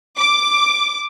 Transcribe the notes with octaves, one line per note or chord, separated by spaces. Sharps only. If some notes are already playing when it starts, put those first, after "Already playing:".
D6